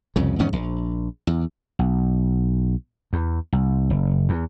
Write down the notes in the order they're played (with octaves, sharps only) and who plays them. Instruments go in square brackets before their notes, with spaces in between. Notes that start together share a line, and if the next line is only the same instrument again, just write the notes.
[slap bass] C2 F2 C#3
E2 G#2 D#3 C#4
A#1
E2
B1
E2
C2
F#1
E2